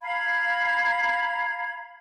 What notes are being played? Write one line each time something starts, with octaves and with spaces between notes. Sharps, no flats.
F5 A#5 B5 G#6